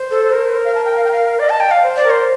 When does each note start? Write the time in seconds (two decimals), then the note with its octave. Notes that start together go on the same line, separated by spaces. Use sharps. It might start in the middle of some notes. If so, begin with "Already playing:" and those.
Already playing: C5
0.11 A4
0.32 A#4
0.65 F5
0.75 A5
0.85 G5
0.96 F5
1.04 G5
1.12 F5
1.39 D5 D#5
1.49 A5
1.60 G5
1.67 D#5
1.71 D5 F5
1.82 C5
1.96 D5
2.04 A#4
2.10 C5